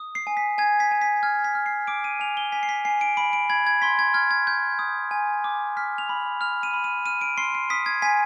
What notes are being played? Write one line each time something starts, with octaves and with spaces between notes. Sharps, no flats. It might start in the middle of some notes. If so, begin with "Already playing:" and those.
Already playing: D#6
C7
G#5
B6
G#5 G#6
B6
G#5
B6
F6 G#6
B6
F6
C7
D6 D7
D#7
G#5 F7
G7
G#5 B6
C7
B6
G#5 C7
D7
B5 D7
D7
B5 G#6
G#6
C6 B6
G#6
F6 G#6
G#6
G6
D#6
G#5
D6
F6 B6
F7
B5
F6 F7
D#7
B5
D#7
F6 D#7
D7
C6 C7
C7
D#6 B6
G#6
G#5 B6